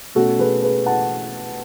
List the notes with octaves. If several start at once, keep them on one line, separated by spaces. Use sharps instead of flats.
B2 A3 C#4 F#4 A4
G#4 B4
G#4 B4
F#5 A5